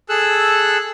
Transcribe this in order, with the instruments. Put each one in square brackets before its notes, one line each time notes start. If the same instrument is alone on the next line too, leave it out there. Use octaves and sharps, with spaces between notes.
[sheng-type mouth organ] G#4 A4 E6 F#6